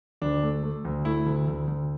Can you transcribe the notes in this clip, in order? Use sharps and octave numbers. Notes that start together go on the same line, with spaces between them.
D2 D4
A3
A3
D2
A3 E4
D2
D2
D2